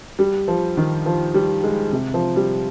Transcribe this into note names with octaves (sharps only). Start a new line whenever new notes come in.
G3
F3
D#3
F3
G3
G#3
C3
F3
G3